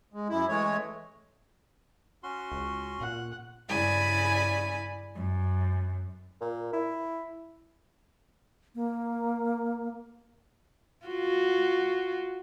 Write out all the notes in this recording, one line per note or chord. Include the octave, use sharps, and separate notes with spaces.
G#3
F#2 E4
E3 G#3 A3 C#5
C#4 F#4 C6
C#2
A#2 F#5
G2 C#3 E4 D5 G#5 B5
F#2
A#2
E4
A#3
F4 F#4